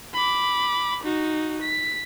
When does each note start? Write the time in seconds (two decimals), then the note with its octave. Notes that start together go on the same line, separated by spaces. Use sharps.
0.14 B5 D6
1.04 D#4 F#4
1.62 B6